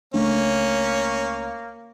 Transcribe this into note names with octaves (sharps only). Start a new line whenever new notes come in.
C#2 A3 A#3 C#4 D4